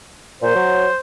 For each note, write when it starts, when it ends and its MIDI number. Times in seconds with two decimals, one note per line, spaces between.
0.42 0.53 46
0.42 1.00 72
0.55 0.86 54